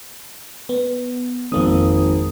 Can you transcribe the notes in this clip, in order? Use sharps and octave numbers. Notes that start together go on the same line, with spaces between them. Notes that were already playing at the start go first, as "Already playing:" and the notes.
B3
G#1 F2 A#3 D#6